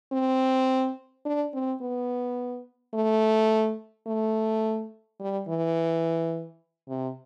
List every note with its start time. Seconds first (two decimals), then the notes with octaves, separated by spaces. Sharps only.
0.12 C4
1.25 D4
1.54 C4
1.82 B3
2.94 A3
4.07 A3
5.20 G3
5.48 E3
6.89 C3